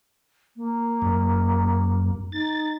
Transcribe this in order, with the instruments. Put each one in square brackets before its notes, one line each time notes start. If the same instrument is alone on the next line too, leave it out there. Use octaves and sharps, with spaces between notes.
[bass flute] A#3
[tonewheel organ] F#2
[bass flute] D#4 [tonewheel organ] A6